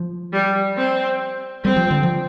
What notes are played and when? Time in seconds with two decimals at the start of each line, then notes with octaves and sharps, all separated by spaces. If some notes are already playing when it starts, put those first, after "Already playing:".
Already playing: F3
0.33 G3
0.77 C4
1.64 G3 C4
1.76 F3
1.90 D3
2.03 F3